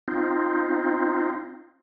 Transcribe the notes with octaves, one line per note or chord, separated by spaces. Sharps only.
C4 D#4 F4